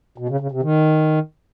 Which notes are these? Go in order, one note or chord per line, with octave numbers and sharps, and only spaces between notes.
B2
C#3
C#3
C3
D#3